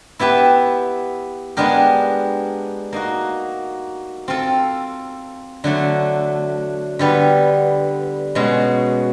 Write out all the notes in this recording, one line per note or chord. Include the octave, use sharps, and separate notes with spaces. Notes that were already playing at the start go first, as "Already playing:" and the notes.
B3 E4 G4 B4 E5
G#3 B3 D4 G4 A#4
A#3 D#4 F#4
C4 F4 A4
D3 F#3 A3
D3 G3 B3
B2 G#3 C#4 F#4